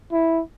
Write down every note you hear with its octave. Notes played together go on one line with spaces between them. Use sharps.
E4